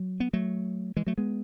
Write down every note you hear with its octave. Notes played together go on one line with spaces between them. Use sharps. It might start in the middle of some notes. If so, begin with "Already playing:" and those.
Already playing: F#3
B3
F#3 A3
E3 G#3
F#3 A3
G#3 B3